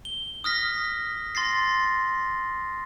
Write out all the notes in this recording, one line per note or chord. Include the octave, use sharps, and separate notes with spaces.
G7
D#6 F6 A#6 B6
C6 A6 A#6 C7